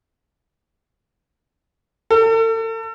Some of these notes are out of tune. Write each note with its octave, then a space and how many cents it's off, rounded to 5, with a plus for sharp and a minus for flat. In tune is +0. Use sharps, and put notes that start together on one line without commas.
A4 +40